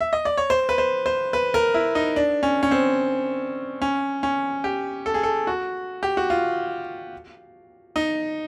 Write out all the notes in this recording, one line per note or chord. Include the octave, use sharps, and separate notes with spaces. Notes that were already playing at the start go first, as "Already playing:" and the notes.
E5
D#5
D5
C#5
C5
B4
C5
C5
B4
A#4
E4
D#4
D4
C#4
C#4
C4
C#4
C#4
G4
A4
G#4
A4
F#4
G4
F#4
F4
D#4